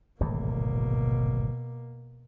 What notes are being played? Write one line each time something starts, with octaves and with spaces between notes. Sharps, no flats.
D1 G#1 E2 B2 A#3